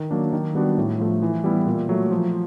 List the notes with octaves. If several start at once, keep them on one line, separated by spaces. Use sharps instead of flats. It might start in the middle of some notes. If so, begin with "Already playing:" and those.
Already playing: D#3
F#3 A#3 D4
D#3
G3 B3 D4 F#4
A2
F3 A3
E3
G3 B3 E4
A#2
F#3 A3
F3